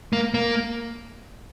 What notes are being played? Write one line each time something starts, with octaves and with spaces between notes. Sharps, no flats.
A#3
A#3